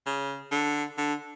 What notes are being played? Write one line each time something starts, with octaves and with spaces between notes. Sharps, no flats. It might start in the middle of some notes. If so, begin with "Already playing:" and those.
C#3
D3
D3